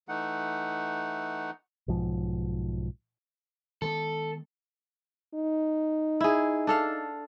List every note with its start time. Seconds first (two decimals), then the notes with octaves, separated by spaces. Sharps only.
0.09 E3 A3 D#4 F#5
1.88 B1 G#2 F3
3.82 D#3 G#3 B3 A4
5.35 D#4
6.21 E4 G#4
6.67 D4 A4 F5